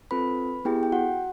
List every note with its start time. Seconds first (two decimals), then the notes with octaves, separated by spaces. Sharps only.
0.11 C4 F4 A4 B4 B5
0.65 B3 E4 G4 G#4 G5
0.83 G5
0.92 F#4 F#5